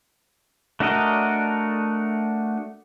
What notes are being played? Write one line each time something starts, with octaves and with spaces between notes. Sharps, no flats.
A3 D4 F#4 A#4 D#5